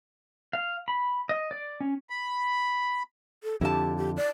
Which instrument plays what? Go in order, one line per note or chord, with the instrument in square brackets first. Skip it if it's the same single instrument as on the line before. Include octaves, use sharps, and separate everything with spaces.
[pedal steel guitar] F5
B5
D#5
D5
C#4
[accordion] B5
[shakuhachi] A4
[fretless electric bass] F2 D3 [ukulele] E4 A5 [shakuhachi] G4
[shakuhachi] G4
D5